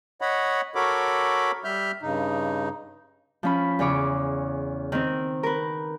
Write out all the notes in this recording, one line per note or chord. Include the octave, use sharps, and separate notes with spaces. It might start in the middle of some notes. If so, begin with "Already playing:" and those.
C#5 D#5 F#5 B5
F#4 A4 A#4 C#5 B5 D6
G3 E5 F6 G6
G2 C#3 D#4
F3 C#4 B5
E2 C#3 C#5 D6
D#3 C4
A#4 B4